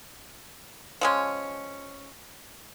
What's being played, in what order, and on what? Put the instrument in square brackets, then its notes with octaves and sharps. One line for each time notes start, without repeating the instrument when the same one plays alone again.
[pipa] F3 G#3 C#4